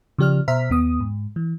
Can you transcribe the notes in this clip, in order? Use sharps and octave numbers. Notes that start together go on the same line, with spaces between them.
C#3 F3 G4 D5 F6
B2 C5 E5 A#5 F6 B6
D#2 B3 D#6
G#2
E3